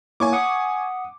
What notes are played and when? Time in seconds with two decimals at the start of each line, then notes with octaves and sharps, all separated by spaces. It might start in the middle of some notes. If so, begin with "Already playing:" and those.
0.20 A#3 E4 C#5 G#5 C#6 D6
0.32 F#5 D#6 C#7